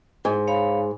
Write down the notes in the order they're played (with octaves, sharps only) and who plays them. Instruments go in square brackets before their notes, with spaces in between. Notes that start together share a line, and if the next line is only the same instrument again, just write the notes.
[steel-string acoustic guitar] G#2
[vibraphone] C#5 F5 B5